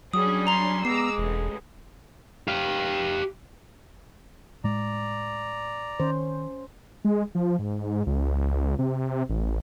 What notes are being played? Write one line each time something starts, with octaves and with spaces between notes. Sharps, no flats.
F#3 G3 C#4 D4 G#4 D#6
A#5 C6 F7
G#3 B3 A#5 D6 E6 C7
E1 A1
G4 F5
A2 G#3 D5 A#5
D#3 C#4 C5
G#3
F3
G#2
C#2
C3
A1